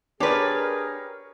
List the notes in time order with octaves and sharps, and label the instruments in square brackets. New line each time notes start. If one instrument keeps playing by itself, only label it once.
[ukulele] D4 D5 [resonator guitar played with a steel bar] G4 B4 [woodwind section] G#4 A#4 [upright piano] C#5